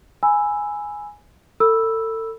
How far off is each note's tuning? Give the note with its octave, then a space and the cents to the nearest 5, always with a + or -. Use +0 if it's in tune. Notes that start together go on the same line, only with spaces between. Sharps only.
G#5 +0 B5 +0 E6 +0
A4 +35 B5 -10 E6 +0